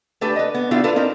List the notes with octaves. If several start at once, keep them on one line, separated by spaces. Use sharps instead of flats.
A3 D4 G4 A4 B4
B4 D#5
B3
B3 D4 E4 F4 G4 F5
D4 F4 A4 B4
C4 D#4 A#4